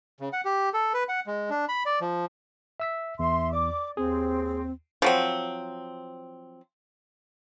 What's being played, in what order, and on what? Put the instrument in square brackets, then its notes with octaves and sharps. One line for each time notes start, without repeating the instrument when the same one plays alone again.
[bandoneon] C#3
F#5
G4
A4
B4
F#5
G#3
D4
B5
D5
F3
[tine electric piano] E5 E6 B6
[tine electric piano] E2 [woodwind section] E5 C6
[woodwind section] D5 D6
[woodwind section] D#2 C4 [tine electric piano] G#4
[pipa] F3 F#3 C4